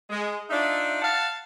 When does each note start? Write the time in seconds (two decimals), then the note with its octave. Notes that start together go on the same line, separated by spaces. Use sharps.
0.10 G#3
0.50 D4 D#4 F4 E5
1.02 F5 F#5 A5